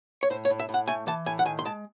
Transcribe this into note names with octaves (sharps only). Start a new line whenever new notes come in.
C#5
A2 C5
C#5
A2
E5
A2
F#5
A3 G#5
E3 A5
A2 G#5
F#5
D#3 G#5
C6
G#3 A5